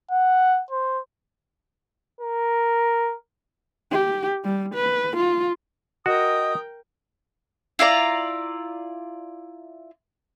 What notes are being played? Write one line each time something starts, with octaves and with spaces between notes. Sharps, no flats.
F#5
C5
A#4
G4
G3
B4
F4
F#4 A#4 D#5 G5 D#6
E4 F4 D5 A#5